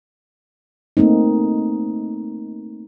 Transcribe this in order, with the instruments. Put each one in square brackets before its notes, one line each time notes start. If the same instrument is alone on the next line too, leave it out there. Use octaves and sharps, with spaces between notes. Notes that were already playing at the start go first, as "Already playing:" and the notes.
[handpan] A3 A#3 C4 D#4